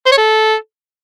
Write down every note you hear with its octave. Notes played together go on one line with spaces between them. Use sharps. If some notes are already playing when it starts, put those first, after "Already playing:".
C5
C#5
A4